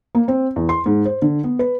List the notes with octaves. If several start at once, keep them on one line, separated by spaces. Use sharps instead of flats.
A#3
C4
E2
C6
G#2
C5
D3
B3
B4